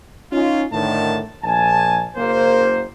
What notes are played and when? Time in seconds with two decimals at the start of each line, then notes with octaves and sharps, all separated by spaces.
0.31 C#4 D#4 F4
0.72 A2 D3 D#3 A5
1.43 A#1 G#5 A5
2.16 F#1 A#3 C5